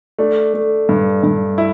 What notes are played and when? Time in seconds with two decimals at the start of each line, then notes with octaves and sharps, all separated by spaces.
0.19 A3 D4
0.54 A3
0.89 G2
1.23 G2
1.58 E4